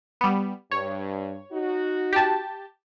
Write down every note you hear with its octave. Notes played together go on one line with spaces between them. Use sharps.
G3 B3
G2 C#5
D#4 F#4
G4 A5